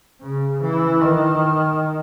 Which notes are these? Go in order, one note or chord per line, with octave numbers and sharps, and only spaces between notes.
C#3
E3
D#3